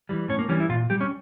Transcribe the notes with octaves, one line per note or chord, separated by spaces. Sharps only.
E3 G3
A2 C#4
A#3
E3 G3 C#4
E4
A#2 F4
G3 G4
C#4